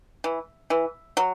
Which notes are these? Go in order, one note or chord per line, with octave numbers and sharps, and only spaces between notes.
E3
E3
F#3